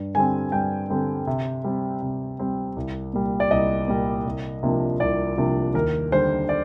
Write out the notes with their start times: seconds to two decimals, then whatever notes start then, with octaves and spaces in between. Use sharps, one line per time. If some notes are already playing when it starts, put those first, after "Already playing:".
Already playing: G2
0.15 D3 G3 C4 G#5
0.52 G2 G5
0.90 D3 G3 C4
1.27 C3
1.64 G3 C4
2.02 C3
2.39 G3 C4
2.76 C2
3.13 A#2 G3
3.40 D5
3.51 C2 D#5
3.88 A#2 G3
4.25 C2
4.63 C3 F3 A#3 D4
5.00 C2 D5
5.38 C3 F3 A#3 D4
5.74 D#2 A#4
6.12 D3 G3 D4 C5
6.49 D5